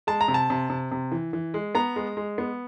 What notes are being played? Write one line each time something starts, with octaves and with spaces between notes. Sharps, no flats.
G#3 A5
A#5
C3
A5
C3
C3
C3
E3
E3
G#3
B3 A#5
G#3
G#3
B3